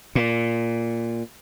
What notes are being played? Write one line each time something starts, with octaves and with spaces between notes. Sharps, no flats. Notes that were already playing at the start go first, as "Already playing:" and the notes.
A#2